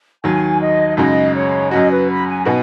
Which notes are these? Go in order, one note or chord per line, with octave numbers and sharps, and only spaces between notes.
D#2 D#3 F#3 G#5
D#5
F#2 C#3 G#3 D#4 F#4 D#5
C#5
F#2 F#3 C#4 F#4 D#5
B4
B5
G#5
B2 B3 D#4 F#4 G#5